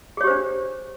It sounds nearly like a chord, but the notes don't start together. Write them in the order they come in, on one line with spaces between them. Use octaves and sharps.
G#4 C#5 G4 C5 D4